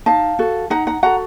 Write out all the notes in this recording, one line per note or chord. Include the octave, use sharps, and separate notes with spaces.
D#4 F5 A5
F#4 A4
D#4 F#5 A#5
F#5 A#5
F#4 A4 F#5 A#5